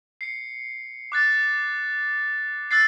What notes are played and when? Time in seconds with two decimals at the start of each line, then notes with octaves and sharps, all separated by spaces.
0.21 C7 C#7
1.12 D6 F#6 A6
2.71 E6 F#6 A6 C7